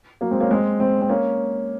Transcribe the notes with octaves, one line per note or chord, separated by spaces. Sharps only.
F#3 A#3
G#3 C4
A#3 C#4
G#3 C4
G#3 C4
C4
A#3 C#4